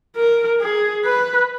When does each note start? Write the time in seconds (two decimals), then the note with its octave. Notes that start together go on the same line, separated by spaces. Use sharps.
0.17 A#4
0.61 G#4
1.05 B4